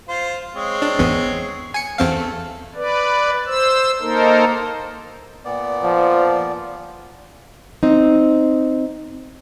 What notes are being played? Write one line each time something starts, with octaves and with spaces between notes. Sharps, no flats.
F4 C5
G#3 C4 C#5
D4
G#1 E2 B3
G#5 C#7
E2 A3 C4 F5
B4 D5
C5 E6
A#3 D#4 A4 A#4 C5
A#2 B3 D5
F3
C4 D#4